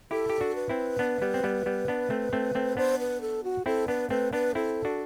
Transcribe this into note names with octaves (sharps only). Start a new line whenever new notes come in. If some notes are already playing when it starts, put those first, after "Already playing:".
E4 G4 A4
G4
D4 F#4
B4
C4 E4
B3 D4
G3 B3
C4
G3 B3
G3 B3
B3 D4
A3 C4
A3 C4
A3 C4
B3 D4 C5
B4
A4
F#4
C4 E4 A4
B3 D4 B4
A3 C4 B4
B3 D4 B4
C4 E4 A4
D4 F#4